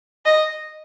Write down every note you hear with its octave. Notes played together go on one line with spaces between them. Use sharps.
D#5